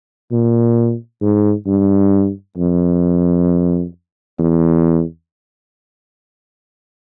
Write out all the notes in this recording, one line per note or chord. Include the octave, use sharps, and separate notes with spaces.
A#2
G#2
G2
F2
E2